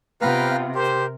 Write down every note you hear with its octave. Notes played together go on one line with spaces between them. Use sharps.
C3 B3 F4 B4 F5 G5 A#5
G4 A#4 C5